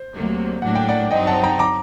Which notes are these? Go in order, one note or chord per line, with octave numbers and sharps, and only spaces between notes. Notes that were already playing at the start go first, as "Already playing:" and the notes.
Already playing: C5
D2 C3 F#3 A#3
A2 F#3 A#3 D4 F#5
G5
D5 F#5
G2 F#3 C4 D#4 D#5 G5
F#5 A5
G5 A#5
A#5 D6